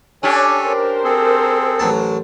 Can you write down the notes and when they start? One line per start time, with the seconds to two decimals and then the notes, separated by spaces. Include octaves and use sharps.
0.23 C#4 D4 G4 A4 C#5 G#5
0.63 A#4 C5
1.04 C4 G#4 A4
1.80 A1 F#3 A5